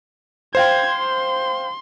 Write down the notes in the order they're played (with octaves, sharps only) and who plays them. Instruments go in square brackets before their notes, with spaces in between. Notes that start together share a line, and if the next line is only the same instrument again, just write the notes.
[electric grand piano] C5 F5 G5 [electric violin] C6 G#6
[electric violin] C6